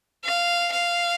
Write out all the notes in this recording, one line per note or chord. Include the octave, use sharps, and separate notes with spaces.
F5
F5